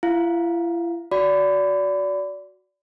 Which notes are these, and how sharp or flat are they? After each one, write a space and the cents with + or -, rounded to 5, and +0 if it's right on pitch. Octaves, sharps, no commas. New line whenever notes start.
E4 +45 F5 +20
F#4 +0 D5 -25 B5 +30